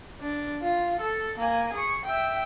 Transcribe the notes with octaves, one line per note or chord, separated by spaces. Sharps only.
D4
F4
A4
A#3 G#5
G#4 C#6
E5 G5